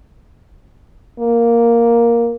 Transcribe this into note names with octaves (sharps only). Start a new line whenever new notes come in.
A#3